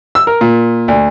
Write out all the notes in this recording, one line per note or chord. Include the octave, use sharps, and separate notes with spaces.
E6
A#4
A#2
D2